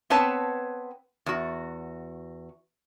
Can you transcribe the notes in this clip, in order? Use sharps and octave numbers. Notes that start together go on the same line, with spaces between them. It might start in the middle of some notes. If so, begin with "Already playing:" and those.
B3 C4 B4 C#5 A5
E2 F#4